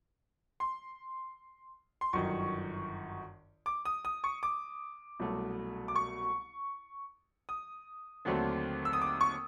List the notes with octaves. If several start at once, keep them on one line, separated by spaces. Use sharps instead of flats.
C6
C6
G1 F#2 D#3 C#6
D6
D#6
D#6
C#6
D6
C2 B2 F#3 A3
D6
C#6
D#6
D#2 D3 F#3 A3 C4
E6
D#6
D6
C#6